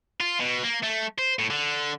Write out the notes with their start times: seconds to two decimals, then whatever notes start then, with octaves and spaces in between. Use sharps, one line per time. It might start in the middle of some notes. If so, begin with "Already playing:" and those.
0.21 F4
0.40 B2
0.64 A#3
0.83 A3
1.19 C5
1.39 A2
1.50 D3